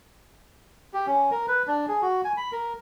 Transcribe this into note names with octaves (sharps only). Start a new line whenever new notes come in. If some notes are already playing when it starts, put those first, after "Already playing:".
G4
C#4
A#4
B4
D4
G#4
F#4
G#5
B5
A#4